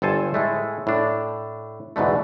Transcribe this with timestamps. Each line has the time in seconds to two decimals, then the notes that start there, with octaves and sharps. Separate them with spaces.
0.02 G1 G2 A4 C5 G#5 A5
0.34 A2 G#3 A3
0.87 A2 D4
1.96 E2 G#2 B2 D3 A3